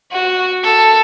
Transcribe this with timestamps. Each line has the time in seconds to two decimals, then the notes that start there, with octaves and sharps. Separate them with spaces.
0.12 F#4
0.64 A4